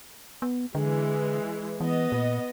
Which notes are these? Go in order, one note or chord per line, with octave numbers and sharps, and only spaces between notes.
B3
D3 E3 G#3
E3 B3 D#5
A#2